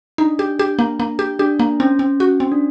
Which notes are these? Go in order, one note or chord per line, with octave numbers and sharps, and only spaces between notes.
D4 D#4
G4
G4
A#3
A#3
G4
D4 G4
A#3
C4 C#4
C4
F#4
C4
D4